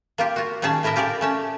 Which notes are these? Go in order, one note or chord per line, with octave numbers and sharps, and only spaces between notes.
A#3 F4 G4
F4 F#4
A#2 D#3 C#4 G#4 G#5 A5
A2 E4 A#4 D#5 E5
F4 G4 G#4 A#4 D5
A3 C#4 A5